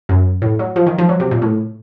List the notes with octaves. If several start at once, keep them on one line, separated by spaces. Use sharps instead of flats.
F#2
A2
F#3
F3
D#3
F3
F#3
C3
A#2
A2